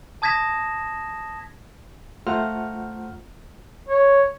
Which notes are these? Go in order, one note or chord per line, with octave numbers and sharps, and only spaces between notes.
A5 D#6 G#6 A#6 B6 E7
A3 F4 C5 F#5 A#5 F6
C#5